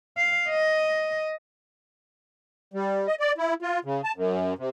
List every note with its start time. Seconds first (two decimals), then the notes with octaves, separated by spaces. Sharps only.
0.17 F5
0.49 D#5
2.74 G3
3.07 D#5
3.20 D5
3.38 E4
3.62 F4
3.85 C#3
4.04 A5
4.16 F#2
4.58 C3